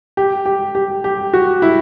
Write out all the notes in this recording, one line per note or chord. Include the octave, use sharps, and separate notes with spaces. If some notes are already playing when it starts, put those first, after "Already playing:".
G4
G4
G4
G4
F#4
E4